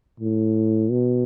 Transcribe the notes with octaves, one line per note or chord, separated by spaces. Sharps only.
A2
B2